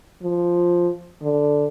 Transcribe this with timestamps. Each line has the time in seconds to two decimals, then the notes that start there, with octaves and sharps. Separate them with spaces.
0.22 F3
1.22 D3